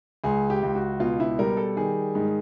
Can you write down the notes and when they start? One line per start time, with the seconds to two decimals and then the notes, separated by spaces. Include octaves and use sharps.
0.24 C#2 G#4
0.50 G4
0.63 C#2
0.75 F#4
1.00 B2 F4
1.20 E4
1.39 G3 A#4
1.57 A4
1.77 D#3 G#4
2.15 G#2